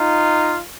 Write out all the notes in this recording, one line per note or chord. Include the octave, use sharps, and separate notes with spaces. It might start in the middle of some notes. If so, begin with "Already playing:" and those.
Already playing: D#4 F4